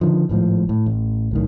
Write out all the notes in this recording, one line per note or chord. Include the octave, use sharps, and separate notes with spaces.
D3 D#3 F3
G#1 A2 C#3 F3
A2
A1
B1 A2 D#3